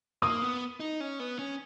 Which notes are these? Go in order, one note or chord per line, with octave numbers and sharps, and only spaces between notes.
A#3 D#6
B3
D#4
C#4
B3
C#4